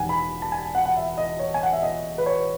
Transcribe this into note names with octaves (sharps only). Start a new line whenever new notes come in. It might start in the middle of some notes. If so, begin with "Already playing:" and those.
Already playing: E1 E2 D#3 F#5 G#5
B5
A5
G#5
F#5
F#5
E5
D#5
C#5
G#5
F#5
E5
D#5
B4
C#5